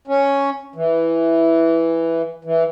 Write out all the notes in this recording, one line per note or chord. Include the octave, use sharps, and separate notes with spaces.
C#4
E3
E3